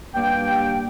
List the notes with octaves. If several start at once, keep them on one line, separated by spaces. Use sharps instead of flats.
G2 A#3 G5